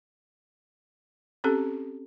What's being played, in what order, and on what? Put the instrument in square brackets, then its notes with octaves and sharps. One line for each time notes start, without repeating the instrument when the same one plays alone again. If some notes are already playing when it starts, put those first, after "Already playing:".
[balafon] C4 C#4 G4 A4